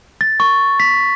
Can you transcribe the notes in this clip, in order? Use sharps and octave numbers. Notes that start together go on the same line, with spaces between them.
A6
C#6
B6